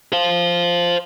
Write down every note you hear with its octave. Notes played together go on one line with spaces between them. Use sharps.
C5 F5